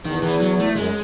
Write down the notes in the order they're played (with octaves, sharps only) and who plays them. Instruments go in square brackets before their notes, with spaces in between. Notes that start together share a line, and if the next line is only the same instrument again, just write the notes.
[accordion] E2 [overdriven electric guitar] D#3
[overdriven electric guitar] E3
F#3
A3
[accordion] F#2 [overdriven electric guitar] G#3